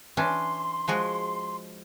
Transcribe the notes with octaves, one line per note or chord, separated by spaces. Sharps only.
E3 C#4 D4 C6
F3 G#3 F#4